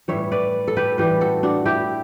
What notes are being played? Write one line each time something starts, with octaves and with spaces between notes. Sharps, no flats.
A2 E3 G3 C#5 E5
B4 D5
A4
G4 B4
A2 E3 G3 G4 B4
F#4 A4
D4 F#4
E4 G4